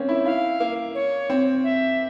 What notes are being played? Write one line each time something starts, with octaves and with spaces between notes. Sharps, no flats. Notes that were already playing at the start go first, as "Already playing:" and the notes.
Already playing: A#3 C4 C#4
E4
E4 F5
A#3
C#5
C4
E5